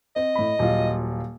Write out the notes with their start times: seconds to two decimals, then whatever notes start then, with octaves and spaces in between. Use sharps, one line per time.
0.16 C4 D#5
0.35 A2 B5
0.59 D#1 F#3 F4